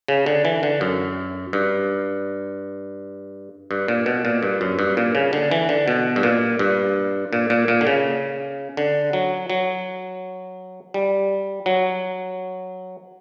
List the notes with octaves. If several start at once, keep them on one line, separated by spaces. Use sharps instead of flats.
C#3
D3
E3
D3
F#2
G2
G2
A#2
B2
A#2
G2
F#2
G2
A#2
C#3
D3
E3
D3
B2
G2
A#2
G2
A#2
A#2
A#2
D3
C#3
D3
F#3
F#3
G3
F#3